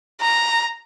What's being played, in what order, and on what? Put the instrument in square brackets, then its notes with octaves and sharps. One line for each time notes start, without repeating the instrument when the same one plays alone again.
[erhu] A#5